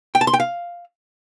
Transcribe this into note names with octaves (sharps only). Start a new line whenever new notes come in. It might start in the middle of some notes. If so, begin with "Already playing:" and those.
G5
A5
C6
G5
F5